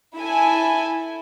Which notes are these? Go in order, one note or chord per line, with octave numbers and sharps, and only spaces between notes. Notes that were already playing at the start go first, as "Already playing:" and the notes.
E4 A4 E5 G#5